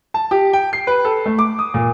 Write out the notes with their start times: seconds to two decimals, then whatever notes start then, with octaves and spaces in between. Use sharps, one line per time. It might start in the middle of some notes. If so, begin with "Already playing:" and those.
0.14 A5
0.31 G4
0.53 G5
0.73 C7
0.87 B4
1.05 A4
1.26 A3
1.39 D6
1.59 D#6
1.74 A#2